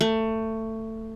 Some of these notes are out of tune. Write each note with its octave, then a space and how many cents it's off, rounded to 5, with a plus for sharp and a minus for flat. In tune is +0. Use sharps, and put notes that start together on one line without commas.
A3 +20